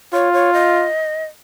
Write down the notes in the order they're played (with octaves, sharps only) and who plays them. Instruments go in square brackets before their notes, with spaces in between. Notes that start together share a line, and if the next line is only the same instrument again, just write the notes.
[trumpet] F4 [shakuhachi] C#5
[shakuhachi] C#5
D#5